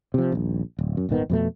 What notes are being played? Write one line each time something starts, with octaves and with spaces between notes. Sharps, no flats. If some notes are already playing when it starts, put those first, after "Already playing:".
C3 F3
D#1 A#1
D1
F#2
D#1 G#1 D#3 B3
F2 B2 A3